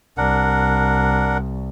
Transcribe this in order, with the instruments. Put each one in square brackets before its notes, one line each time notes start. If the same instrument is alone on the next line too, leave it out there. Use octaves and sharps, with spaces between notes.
[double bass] C2 [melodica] D4 A#4 F#5